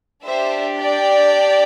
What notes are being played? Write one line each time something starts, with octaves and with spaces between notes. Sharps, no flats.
D4 G4 C5 E5
D5 G5